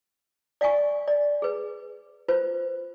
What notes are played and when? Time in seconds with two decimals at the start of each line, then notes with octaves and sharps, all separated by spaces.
0.61 D5 F5 F#5 G#5 C#6
1.08 D5
1.42 G#4 B4
2.28 F4 B4 C5